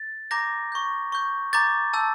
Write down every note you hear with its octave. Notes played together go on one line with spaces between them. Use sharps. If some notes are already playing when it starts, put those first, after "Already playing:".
Already playing: A6
A#5 D6 G6 A#6
C#6 G6
C#6 G6
A#5 D6 G6 A6
A5 E6 G6